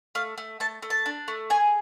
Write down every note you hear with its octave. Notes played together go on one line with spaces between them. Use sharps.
A3 F5
A3
A3 A5
A3
A5
D4
A3
G#4 G#5